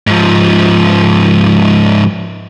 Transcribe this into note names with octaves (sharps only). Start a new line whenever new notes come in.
G#2 F3